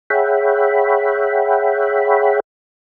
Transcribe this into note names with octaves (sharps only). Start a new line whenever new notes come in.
G#4 C#5 E5 F#5 G5 B5